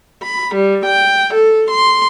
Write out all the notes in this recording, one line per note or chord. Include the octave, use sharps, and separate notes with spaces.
B5
G3
G5
A4
C6